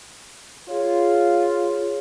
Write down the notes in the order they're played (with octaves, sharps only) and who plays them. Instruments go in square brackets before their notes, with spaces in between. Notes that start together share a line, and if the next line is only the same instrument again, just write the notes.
[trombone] F4 [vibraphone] G#4 C#5